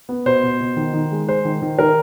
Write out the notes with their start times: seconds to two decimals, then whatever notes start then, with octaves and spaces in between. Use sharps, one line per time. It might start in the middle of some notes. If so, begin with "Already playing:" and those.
0.09 B3
0.26 B2 C5
0.43 B2
0.60 B2
0.77 D#3
0.94 D#3
1.12 G#3
1.28 G#3 C5
1.45 D#3
1.62 D#3
1.79 D#3 A#4